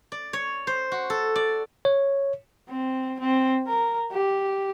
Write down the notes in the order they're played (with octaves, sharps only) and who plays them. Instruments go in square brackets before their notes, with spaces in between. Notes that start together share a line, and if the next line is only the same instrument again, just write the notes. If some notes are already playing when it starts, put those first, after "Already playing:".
[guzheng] D5
C#5
C5
F#4
A4
D5
[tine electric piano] C#5
[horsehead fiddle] C4
C4
A#4
G4